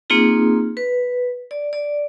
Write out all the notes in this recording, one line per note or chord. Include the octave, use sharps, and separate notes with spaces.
A#3 C4 D#4 F4 G#4
B4
D5
D5